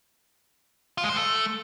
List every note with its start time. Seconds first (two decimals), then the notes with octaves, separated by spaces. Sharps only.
0.98 F4
1.04 G#3
1.09 C5
1.15 A3